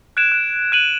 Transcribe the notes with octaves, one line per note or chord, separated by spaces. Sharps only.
F#6 G#6 D7 E7
F#6
F#6 D#7 F#7